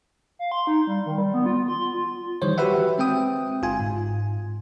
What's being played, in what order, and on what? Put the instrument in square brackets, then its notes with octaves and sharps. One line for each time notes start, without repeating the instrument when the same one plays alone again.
[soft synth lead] F5
C6
D#4
G3
D#3
G3
B3
F4
C6
F4
[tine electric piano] D#3 E3 G3 C5 C#5
F#4 G4 B4 E5 F#5
G#3 C4 E5 G5 D#6
G1 F4 G#5
G#2